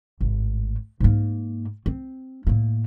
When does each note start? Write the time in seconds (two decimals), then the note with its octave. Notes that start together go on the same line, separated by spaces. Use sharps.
0.21 G#1 A2
1.00 G#2 A#3
1.86 C4
2.47 A2 A#3